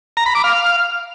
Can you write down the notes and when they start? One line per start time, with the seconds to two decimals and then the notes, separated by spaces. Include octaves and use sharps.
0.17 A#5
0.26 B5
0.35 D6
0.44 F5